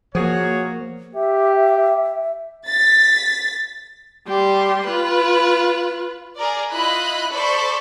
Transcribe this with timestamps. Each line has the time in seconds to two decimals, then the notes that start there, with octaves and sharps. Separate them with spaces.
0.15 F3 A#3 F#4 G#4 C#5
1.15 G4 E5
2.67 A6 B6
4.27 G3 G4 C6
4.86 F4 B4
6.37 G#4 A#4 D5
6.72 E4 F4 D#5 B5 F#6
7.32 A4 C5 D5 B5 C#6 B6